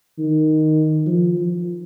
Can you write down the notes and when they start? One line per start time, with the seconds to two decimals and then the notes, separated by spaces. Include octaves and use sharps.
0.18 D#3
1.06 F3
1.36 F3